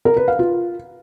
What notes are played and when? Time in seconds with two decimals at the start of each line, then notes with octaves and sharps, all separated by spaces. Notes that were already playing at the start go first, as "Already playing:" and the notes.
0.05 A#4
0.17 B4
0.28 F5
0.39 F4